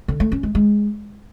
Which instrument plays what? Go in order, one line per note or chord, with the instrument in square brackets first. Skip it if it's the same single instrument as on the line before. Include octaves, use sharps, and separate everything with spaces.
[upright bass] D3
A3
C#4
G#3
G#3